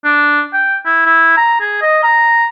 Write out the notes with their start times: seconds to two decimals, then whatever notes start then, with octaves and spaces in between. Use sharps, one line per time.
0.05 D4
0.53 G5
0.85 E4
1.06 E4
1.37 A#5
1.60 G#4
1.82 D#5
2.03 A#5